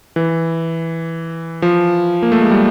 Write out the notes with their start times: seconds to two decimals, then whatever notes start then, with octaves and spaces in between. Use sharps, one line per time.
0.16 E3
1.62 F3
2.23 A#3
2.32 A3
2.41 G#3
2.51 G3